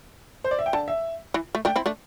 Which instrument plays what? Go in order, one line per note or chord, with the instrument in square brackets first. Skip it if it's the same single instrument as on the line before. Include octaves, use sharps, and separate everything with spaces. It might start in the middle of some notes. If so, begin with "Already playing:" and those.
[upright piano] C5
D5
E5
G5
[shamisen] D3 [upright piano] A5
[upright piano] E5
[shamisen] E3
A3
[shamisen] A3 D4 [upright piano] G5
[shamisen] C4 E4
A3 D4